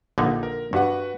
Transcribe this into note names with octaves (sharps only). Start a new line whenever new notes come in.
A#1 D3 D#4
A#4
G2 F#4 B4 F#5